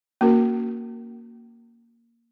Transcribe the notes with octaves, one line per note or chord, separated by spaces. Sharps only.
A#3 C#4 F#4 A#4